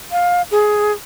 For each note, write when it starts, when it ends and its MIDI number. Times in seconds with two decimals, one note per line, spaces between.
0.12 0.42 77
0.51 0.92 68